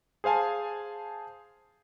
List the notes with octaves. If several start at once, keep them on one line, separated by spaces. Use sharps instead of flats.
G#4 C5 F5 G#5 A5